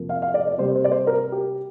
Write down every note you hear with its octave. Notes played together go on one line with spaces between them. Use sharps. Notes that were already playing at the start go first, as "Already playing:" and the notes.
Already playing: F2 C3 F3 A#3
F5
F5
D5
D5
C3 G3 A#3 C5
C5
D5
C5
A#4
G4